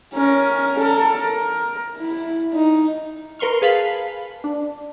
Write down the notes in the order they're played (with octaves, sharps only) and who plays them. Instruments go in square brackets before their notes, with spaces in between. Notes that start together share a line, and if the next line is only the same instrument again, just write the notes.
[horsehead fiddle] C#4 A#4
A4 A#4
A#4
E4
D#4
[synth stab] A#4 B4 C6 C#6 F6
G#4 B4 F5 A5 B5
D4